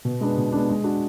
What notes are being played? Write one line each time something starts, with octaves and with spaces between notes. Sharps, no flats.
B2
G#3 B3 D4
B2
G#3 B3 D4
G#3
D4 F#4